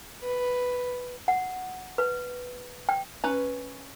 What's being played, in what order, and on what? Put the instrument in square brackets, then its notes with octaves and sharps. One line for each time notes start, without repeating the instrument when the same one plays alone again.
[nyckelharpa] B4
[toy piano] F#5
B4
G5
[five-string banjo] C#4 B4 A#5